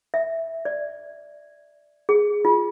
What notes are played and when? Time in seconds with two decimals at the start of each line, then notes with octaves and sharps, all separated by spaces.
0.14 E5
0.65 D5
2.09 G#4
2.45 F4